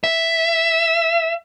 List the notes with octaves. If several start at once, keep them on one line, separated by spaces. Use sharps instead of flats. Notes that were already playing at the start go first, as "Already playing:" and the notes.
E5